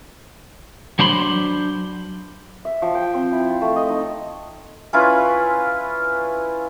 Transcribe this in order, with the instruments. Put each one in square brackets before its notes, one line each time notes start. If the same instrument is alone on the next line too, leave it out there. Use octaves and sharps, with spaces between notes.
[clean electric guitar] F#3 D4 C5 B5 C6
[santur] E5
F3
G5
C4
E4
F4
A3
D#5
D#4
C#4 E4 F4 B4